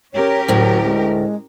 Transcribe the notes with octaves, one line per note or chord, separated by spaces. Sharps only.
C#4 G4 A#4 C#5
D2 A2 F#3
G#3